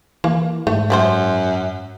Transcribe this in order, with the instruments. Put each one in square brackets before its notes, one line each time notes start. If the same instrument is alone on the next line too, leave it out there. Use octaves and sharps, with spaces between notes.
[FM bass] E3 [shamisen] A#3
[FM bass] G#2 [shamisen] A3
[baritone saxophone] F#2 [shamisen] E4 B4 C5